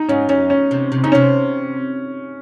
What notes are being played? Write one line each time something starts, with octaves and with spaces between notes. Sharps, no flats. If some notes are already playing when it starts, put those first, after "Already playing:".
Already playing: D#4
G#2 C#4
F#2 C#4
C#4
C3
C3
C#3 D#4
C3 C#4